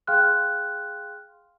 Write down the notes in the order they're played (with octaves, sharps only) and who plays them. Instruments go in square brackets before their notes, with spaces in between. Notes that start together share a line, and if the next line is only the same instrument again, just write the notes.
[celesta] G#4 F5 G5 C6 F6 F#6